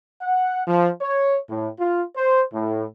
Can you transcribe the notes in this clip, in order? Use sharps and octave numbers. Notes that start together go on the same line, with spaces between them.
F#5
F3
C#5
A2
F4
C5
A2